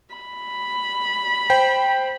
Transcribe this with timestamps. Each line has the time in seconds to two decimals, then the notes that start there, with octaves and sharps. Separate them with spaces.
0.15 B5
1.50 C5 G5